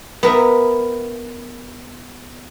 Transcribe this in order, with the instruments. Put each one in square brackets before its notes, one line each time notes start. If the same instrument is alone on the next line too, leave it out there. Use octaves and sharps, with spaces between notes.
[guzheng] B3 A#4 E5